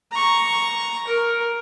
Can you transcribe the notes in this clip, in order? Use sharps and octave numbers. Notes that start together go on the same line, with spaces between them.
A#5 C#6
A#4